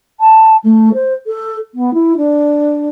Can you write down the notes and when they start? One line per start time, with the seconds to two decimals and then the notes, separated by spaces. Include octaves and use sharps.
0.20 A5
0.64 A3
0.94 C5
1.27 A4
1.75 B3
1.94 E4
2.17 D4